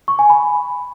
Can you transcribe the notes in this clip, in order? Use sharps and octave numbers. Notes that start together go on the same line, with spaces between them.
C#6
G#5
B5